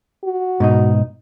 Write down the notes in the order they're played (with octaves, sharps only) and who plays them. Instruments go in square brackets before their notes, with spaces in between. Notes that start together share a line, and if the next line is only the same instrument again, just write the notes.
[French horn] F#4
[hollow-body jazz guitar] G#2 B2 D#4